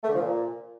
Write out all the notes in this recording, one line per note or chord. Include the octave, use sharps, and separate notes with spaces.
A3
D3
F3
A#2